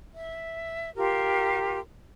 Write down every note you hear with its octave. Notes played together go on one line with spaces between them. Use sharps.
E5
F4 G4 A#4